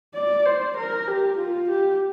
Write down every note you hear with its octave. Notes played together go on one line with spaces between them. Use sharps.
D5
C5
A#4
G4
F4
G4